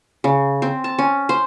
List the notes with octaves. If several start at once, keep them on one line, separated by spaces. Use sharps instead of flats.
C#3
C4
A5
C#4
C5